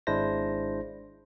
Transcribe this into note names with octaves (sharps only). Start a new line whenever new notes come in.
G#1 G#3 D4 E4 C5 A#6